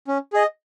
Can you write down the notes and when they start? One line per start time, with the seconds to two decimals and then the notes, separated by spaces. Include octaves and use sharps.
0.08 C#4
0.33 G#4 D#5